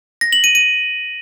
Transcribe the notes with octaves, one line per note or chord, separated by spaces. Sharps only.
A#6
F#7
D#7
D#7